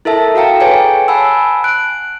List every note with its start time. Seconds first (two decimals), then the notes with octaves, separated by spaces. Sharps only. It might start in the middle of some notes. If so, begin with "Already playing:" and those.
0.05 E4 A4 A#4 E5 A5
0.35 F#4 A4 F5 G5 A#5
0.60 G#4 B4 C#5 G5 G#5
1.08 F#5 G#5 A5 B5 E6
1.64 F#6 D7